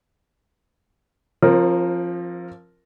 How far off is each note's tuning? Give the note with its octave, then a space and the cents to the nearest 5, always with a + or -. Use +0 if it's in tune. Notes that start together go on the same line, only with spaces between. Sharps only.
F3 +0 C4 +40 A#4 +0